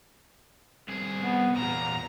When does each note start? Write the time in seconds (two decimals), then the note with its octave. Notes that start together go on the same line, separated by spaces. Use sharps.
0.89 C2 G#4
1.23 B3
1.57 E2 A#2 A#5